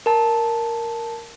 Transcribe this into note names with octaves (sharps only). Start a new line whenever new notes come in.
A#4 A5